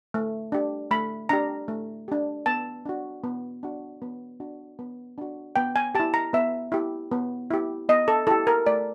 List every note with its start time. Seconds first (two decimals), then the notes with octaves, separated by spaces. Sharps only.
0.14 A3
0.52 D4 G4
0.91 A3 B5
1.29 D4 G4 A#5
1.68 A3
2.08 D4 G4
2.46 B3 A5
2.85 D4 F#4
3.24 B3
3.63 D4 F#4
4.02 B3
4.40 D4 F#4
4.79 B3
5.18 D4 F#4
5.56 B3 G5
5.76 G#5
5.95 E4 G4 A5
6.14 A#5
6.33 B3 E5
6.72 E4 G4
7.12 B3
7.50 E4 G4
7.89 B3 D#5
8.08 A4
8.27 E4 G4 A4
8.47 A#4
8.66 A3 D5